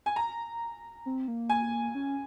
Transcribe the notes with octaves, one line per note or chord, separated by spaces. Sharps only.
G#5
A#5
C4
A#3
G#5
C#4